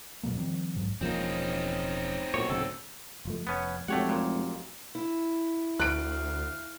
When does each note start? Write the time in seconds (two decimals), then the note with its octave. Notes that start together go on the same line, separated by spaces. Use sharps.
0.23 E1 B2 F#3 A#3
0.37 D#3 F3 G3 C4
0.75 D#1 A#1 G#2 F#3
1.01 E1 C#3 F3 A#3 C4 D#4
2.34 B1 A#2 C#5
2.50 D1 D2 C#3 A4
3.25 F#1 F3 A3
3.47 F1 B3 C#4
3.88 F1 F#2 G#3 A3 G4 C#5 F#5
4.09 A#2
4.95 E4
5.80 D2 F5 F#6 D7